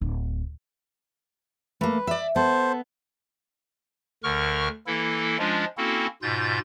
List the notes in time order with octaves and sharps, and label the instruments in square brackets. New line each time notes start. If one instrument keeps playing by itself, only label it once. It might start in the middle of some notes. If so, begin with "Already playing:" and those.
[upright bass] D1
[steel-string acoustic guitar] A3 A#3 [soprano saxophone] B4
[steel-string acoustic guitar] D5 E5
[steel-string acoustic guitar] B3 [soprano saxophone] A4 [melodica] C5
[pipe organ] D2 D3 A#4 C#6 F6
E3 A#3 E4 A4
F3 G#3 C#4 D4 F4
A#3 C4 C#4 E4 F#4 A4
G#2 B2 F4 G6 A6